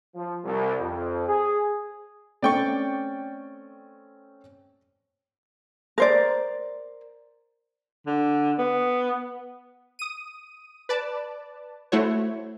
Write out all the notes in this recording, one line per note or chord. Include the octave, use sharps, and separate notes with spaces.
F3
C2
F2
G#4
A3 C4 C#4 D5 G5 C#6
A#4 C5 D5
D3
B3
D#6 D#7
B4 D5 A5
A3 E4 F#4 C5 C#5